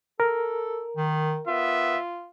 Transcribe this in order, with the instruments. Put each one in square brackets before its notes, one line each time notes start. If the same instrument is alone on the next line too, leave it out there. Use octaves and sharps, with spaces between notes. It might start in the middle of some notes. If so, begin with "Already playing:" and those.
[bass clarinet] A4 [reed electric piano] A#4
[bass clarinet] D#3
[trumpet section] B3 E5 [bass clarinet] F4